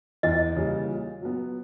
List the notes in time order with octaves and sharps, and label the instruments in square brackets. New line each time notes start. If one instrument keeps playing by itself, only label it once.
[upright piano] E2 [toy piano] D#5
[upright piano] C#3 E3 G3 A#3
A#2
F#3 B3